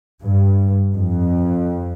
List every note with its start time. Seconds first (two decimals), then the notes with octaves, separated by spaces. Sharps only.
0.23 G2
0.95 F2